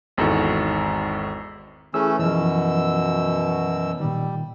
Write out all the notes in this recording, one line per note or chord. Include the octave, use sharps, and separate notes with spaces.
G#1 E2 D#4 F#4 A4 C#6
E3 A3 C#4 E4 G#4 E6
F#2 B2 E3 F3 E6
A#2 D#3 G3